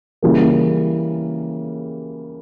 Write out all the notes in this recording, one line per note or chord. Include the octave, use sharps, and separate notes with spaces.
C#3 E3 G3 A#3